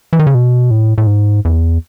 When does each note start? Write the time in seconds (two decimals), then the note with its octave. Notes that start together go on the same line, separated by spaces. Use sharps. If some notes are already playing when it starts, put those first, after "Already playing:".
0.13 E3
0.19 D#3
0.27 C#3
0.34 B2
0.71 A2
0.98 A2
1.07 G#2
1.45 E2